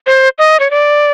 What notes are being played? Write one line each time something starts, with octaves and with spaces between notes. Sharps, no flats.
C5
D#5
C#5
D5